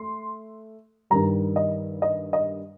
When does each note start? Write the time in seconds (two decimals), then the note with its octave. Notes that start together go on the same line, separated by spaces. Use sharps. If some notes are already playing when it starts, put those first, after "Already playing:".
Already playing: A3 C6
1.10 G2 D#3 G3 A#5
1.56 D#5
2.02 D#5
2.33 D#5